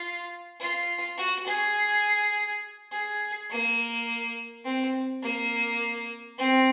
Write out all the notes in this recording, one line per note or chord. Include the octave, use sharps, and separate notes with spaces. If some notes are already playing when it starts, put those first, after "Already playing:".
Already playing: F4
F4
F#4
G#4
G#4
A#3
C4
A#3
C4